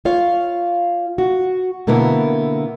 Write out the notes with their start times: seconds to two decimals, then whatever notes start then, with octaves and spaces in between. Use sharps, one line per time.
0.05 F4 C#5 F5
1.18 F#4
1.87 B2 D3 A#3 B3 E4 A#4